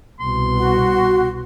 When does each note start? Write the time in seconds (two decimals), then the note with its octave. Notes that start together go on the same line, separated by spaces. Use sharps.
0.20 C2 B2 C6
0.57 F#4